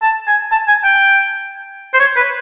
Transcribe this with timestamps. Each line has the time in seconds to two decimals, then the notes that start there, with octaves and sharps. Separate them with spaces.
0.03 A5
0.27 G#5
0.52 A5
0.68 G#5
0.84 G5
1.94 C5
2.00 C#5
2.16 B4